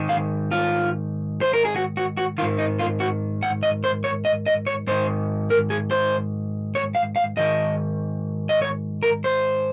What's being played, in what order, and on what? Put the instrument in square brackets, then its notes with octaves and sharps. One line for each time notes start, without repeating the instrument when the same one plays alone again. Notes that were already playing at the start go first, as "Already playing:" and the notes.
Already playing: [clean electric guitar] G#2 D#3
F5
F4
C5
A#4
G#4
F#4
F#4
F#4
D#3 F4
G#2
D#4
F4
F#4
F#5
D#5
C5
C#5
D#5
D#5
C#5
G#2 D#3 C5
A#4
G#4
C5
C#5
F5
F5
G#2 D#3 D#5
D#5
C#5
A#4
C5